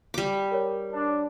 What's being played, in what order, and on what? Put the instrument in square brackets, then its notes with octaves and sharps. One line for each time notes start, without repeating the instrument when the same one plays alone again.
[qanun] G3 D6
[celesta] A#4 C#5
[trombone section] D4